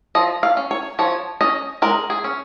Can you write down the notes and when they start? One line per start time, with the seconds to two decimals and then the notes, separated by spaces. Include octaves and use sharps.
0.15 F3 D#5
0.43 F5
0.57 C#4
0.71 C#5
0.99 F3 C#5
1.41 C#4 D#5
1.82 G#3 A#4
2.10 G#4
2.24 C#4